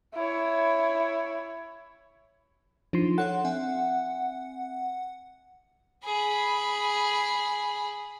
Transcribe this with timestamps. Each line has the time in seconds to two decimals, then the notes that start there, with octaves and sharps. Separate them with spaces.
0.14 E4 C#5
2.93 F3 D4 D#4 C6
3.18 A4 C#5 F#5 C6
3.44 C4 E5 G#5
6.05 G#4 B5